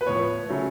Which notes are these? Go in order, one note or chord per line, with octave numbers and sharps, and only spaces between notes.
B4
A2 F3 B3 C#5
C#3 F#3 A3